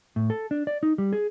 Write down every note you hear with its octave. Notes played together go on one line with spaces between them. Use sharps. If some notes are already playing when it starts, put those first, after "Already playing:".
A2
A4
D4
D5
D#4
G3
G#4